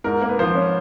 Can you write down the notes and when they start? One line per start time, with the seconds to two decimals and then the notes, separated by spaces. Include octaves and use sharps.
0.04 G#2 A#4
0.21 A#3
0.29 B4
0.39 F3 C5
0.55 C#4